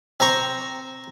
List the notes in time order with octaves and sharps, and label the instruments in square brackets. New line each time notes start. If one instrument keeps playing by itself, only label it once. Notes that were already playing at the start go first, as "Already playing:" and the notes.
[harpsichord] C4 C5 A#5 C#6